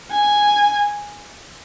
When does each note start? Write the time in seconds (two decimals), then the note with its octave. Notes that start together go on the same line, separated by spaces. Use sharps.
0.11 G#5